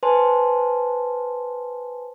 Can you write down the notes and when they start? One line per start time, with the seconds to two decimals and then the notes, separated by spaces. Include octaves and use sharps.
0.03 B4 C5 G#5 A5 C6